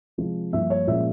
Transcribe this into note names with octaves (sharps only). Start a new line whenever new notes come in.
C3 F3 G#3
G2 F3 A#3 F4 E5
C#5
A#2 F3 G#3 C#4 E5